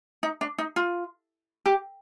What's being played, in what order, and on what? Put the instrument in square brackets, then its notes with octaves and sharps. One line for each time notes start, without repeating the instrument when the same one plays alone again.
[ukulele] D#4
D4
D#4
F4
G4